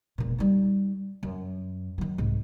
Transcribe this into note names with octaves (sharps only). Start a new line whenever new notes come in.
E1 A#2
G3 D#4
F#2
D#3 F#3
C2 G#2